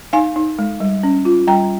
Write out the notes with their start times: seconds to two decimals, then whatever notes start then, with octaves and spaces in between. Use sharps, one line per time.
0.13 D#4 F5 G#5
0.36 D#4
0.59 G#3
0.80 G3
1.03 C#4
1.25 F4
1.48 G3 G5 A#5